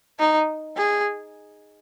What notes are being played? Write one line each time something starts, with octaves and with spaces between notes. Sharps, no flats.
D#4
G#4